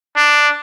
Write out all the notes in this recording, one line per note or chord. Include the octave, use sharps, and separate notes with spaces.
D4